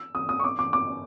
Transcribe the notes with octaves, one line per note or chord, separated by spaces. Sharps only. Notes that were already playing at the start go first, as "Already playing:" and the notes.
Already playing: E6
D#6
D#6
C#6
D6
D6
D6